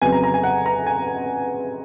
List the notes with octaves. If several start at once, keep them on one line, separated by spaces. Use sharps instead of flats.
F2 C#3 F#3 B3 G#5
A#5
A#5
G#5
F#5
A#5
G#5